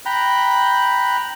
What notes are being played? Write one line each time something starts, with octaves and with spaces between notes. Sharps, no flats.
G5 A#5 B5 F#6